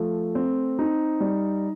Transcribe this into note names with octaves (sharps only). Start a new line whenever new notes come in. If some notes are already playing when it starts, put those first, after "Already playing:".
Already playing: F3 A3
C4
D#4
G3